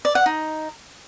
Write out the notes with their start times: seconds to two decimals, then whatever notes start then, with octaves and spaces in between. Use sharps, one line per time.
0.05 D5
0.15 F#5
0.26 D#4